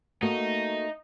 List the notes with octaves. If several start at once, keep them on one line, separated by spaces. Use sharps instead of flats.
A3 A#3 D#4 F#4